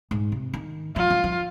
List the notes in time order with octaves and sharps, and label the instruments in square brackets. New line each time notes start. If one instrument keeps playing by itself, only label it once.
[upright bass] G#2
C3
D#3
[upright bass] F3 [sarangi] F4
[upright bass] F3
F3